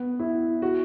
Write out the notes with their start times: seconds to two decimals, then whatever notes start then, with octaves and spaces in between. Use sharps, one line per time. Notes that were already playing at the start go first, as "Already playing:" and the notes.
Already playing: B3
0.20 E4
0.62 F#4